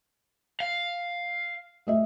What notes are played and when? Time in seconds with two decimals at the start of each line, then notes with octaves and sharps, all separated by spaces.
0.60 F5
1.87 A3 D#5 E5